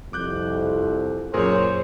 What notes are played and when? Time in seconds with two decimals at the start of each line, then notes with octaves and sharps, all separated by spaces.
0.13 C2 F2 D6 F#6 G6
1.34 F#2 A#2 G#4 A#4 C5 C#5